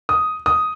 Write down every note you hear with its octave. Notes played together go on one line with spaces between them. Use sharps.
D#6
D#6